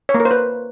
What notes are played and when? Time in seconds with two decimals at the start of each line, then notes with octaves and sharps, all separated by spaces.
0.09 C#5
0.14 A#3
0.20 A#4
0.25 C5
0.31 B4